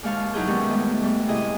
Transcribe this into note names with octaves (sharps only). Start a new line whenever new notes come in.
D#2 G#3 C#5 F5 A5
F#3 D#4 E4 G#4 G6
B2 D#3 G3 G#3 C#4
G#3 A3 B3
G#2 G3 A3
C3 E4 G#4 D#5 G#5 D#6